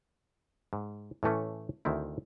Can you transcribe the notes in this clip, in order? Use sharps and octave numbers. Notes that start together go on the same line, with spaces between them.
G#2
A2 E3 A3 C#4
D2 D#3 C4 E4